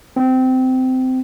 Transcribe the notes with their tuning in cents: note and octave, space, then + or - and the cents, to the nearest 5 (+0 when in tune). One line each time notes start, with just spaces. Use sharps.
C4 -20